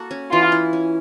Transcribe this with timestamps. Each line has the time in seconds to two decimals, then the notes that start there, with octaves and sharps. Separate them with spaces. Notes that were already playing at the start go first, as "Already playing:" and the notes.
Already playing: A#3 F#4 A4
0.11 C#4
0.32 E3 F4
0.52 E4
0.73 C#4